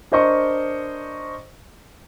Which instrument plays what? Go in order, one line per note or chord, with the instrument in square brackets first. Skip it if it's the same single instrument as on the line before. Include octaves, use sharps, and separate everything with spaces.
[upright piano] D4 A#4 C5 D#5 C#6